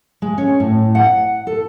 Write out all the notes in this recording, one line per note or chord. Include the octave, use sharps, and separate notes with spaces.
G#3
C#4
A2
F#5
A4